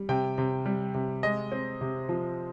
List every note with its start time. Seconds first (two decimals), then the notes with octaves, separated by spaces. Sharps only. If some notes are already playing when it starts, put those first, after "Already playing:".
Already playing: G3
0.09 C3 G5
0.38 C3
0.66 G3
0.94 C3
1.23 G#3 D#5
1.52 C4
1.81 C3
2.09 F3